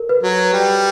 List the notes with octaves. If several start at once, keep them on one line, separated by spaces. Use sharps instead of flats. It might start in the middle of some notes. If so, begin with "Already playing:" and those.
Already playing: A4 A#4
B4
F#3
G3